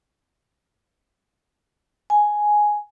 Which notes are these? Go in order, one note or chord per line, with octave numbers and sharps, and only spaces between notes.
G#5